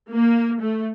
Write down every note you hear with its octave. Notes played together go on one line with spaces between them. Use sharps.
A#3
A3